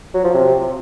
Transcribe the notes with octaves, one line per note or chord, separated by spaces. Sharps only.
F#3
F3
C3